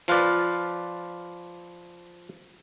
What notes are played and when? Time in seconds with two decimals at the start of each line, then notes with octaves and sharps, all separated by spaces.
0.08 F3 F4 B4 D5